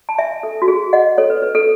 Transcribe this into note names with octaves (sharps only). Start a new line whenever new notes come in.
A5
E5 G#5
A4
F#4
G#4
D#5 F#5
A4 C#5
B4
B4
A4